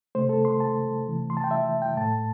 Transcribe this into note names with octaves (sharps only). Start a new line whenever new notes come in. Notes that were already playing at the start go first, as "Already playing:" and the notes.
C3 A3 C5
A4
C6
A5
C3 E3 A3
C6
A5
G5
E5
G5
A2 A3 A5